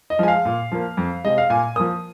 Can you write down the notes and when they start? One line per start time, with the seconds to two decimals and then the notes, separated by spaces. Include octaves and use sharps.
0.10 D#5
0.19 F3 G#3 G#5
0.28 F5
0.45 A#2
0.72 F3 A#3
0.97 F2
1.24 C3 G#3 D#5
1.38 F5
1.50 A#2 G#5
1.76 F3 A#3 D#6